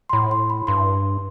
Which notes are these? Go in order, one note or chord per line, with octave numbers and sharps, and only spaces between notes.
C6
A2 B5
C6
B5
G2 C6